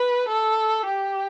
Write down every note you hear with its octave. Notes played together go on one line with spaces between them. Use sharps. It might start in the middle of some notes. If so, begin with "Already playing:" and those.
Already playing: B4
A4
G4